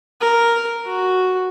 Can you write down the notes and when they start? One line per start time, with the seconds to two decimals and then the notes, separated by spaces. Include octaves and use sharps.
0.21 A#4
0.86 F#4